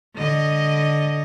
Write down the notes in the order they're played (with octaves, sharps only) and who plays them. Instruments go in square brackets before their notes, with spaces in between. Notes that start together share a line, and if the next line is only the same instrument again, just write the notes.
[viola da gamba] D3 D#5